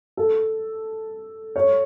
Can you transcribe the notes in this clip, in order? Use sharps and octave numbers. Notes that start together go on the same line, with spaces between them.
A4
C#5